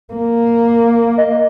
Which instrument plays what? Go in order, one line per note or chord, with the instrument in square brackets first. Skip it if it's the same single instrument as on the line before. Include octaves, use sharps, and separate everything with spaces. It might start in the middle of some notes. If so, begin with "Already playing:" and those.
[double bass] A#3
[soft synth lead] D#5